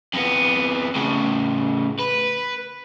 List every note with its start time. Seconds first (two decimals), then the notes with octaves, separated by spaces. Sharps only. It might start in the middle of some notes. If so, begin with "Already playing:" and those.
0.14 F2 B3
0.96 A2 C#3
2.00 B4